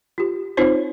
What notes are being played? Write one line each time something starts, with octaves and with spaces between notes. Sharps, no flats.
F4 G4
C4 D#4 F4 C5 C#5